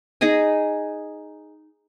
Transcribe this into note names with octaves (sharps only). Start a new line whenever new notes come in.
D#4 G#4 D#5 G#5